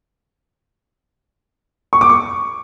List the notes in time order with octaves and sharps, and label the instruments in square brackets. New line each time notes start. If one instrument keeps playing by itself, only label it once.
[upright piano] C#6
D6
C#6